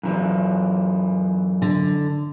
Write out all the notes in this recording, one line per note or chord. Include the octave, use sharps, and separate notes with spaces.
F#2 E3
D3